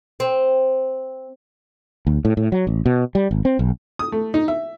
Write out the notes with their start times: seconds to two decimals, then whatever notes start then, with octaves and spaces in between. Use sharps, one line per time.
0.20 C4
2.07 D2
2.25 A2
2.37 A2
2.52 F#3
2.67 A1
2.86 B2
3.15 G3
3.31 G#1
3.45 C4
3.59 B1
3.99 D#6
4.12 A3
4.34 D#4
4.48 E5